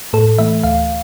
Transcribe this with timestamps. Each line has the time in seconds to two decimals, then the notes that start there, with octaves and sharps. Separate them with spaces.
0.13 A2 A4
0.38 E3 A3 E5
0.63 D2 F5